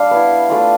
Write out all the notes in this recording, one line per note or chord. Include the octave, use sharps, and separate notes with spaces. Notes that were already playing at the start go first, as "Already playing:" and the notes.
Already playing: G3 D4 F5
B3 E4
A3 D4 F4